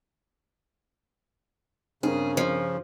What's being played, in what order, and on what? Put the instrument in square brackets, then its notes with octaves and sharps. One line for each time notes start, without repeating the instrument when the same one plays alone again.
[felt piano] G2 [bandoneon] C#3 [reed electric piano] C4 A#4 [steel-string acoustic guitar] G#4
[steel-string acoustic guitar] F3